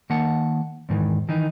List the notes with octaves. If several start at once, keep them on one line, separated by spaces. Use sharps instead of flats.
D#3 A#3 F#5 A5
E2 G#2 D#3 E3
D#3 E3 D#4